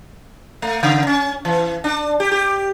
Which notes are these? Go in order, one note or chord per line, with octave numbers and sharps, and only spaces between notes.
A3
C#3
C#4
E3
D4
G4
G4